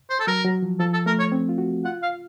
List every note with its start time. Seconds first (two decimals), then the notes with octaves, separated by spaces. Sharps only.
0.10 C5
0.20 A4
0.27 F#3 A#4
0.45 F#3
0.62 F3
0.79 F3 A4
0.93 A4
1.06 A3 A#4
1.19 C#5
1.32 C4
1.49 F4
1.58 F#4
1.85 F4 F#5
2.02 F5